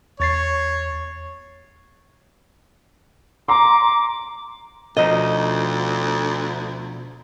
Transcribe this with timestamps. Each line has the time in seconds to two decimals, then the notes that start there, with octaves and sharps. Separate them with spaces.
0.20 E2 C#5 A6 C7
3.48 A#5 C6 D6
4.97 D2 B2 F3 D#4 D#5